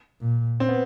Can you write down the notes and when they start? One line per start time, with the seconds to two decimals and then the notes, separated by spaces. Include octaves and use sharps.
0.22 A#2
0.60 C4
0.68 B3